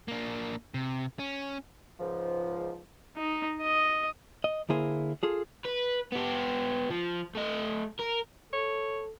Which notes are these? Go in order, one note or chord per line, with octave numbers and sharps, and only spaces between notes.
A#3 D4
C3
C#4
C#2 G#2 F3
D#4
D#5
D#5
D3 A#3 E4 G#4 C5
F4 G#4 A4
B4
B3 G4
F3
A3 D#5
A#4
A4 C#5